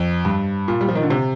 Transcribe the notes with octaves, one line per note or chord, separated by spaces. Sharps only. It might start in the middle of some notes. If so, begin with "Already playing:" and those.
Already playing: F2
G2
A#2
G3
F3
D#3
D3
C3